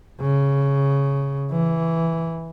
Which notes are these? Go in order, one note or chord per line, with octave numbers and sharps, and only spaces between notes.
C#3
E3